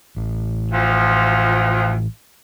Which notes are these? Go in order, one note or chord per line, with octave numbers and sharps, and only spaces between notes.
A1
D2 F3